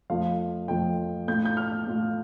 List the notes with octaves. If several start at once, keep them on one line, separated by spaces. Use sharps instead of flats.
F2 F3 A3 F4 F5
F2 F3 A3 F4 G5
A2 A3 F4 G6
G6
F6
A2 A3 F4